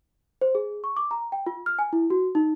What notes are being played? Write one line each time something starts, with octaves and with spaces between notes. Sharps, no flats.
C5
G#4
C#6
D6
A#5
G5
F4
F6
G#5
E4
F#4
D#4